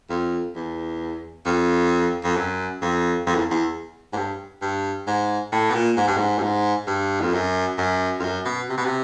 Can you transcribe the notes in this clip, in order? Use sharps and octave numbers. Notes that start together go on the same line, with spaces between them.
F2
E2
F2
F2
F#2
F2
F2
E2
E2
G#2
G2
G2
G#2
A2
B2
A#2
G#2
G2
G#2
G2
G#2
G2
F2
F#2
F#2
F2
F#2
B2
C3
B2
C3